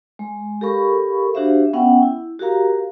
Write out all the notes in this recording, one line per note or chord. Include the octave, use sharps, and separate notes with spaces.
G#3
G4 A4 A#4 F5 B5 C#6
D4 F#4 G4 C5 E5 F5
B3 C#4 E5 F#5 G5
E4
F#4 G4 A#4 F5 A#5